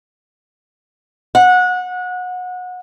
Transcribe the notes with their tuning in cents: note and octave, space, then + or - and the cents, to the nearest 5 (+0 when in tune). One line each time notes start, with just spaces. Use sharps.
F#5 -25